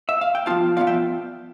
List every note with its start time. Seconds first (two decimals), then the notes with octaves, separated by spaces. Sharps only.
0.09 E5
0.21 F5
0.35 G5
0.46 F3 B3 F4 F5 A5
0.77 F3 B3 F4 D5 F5
0.87 E5 G5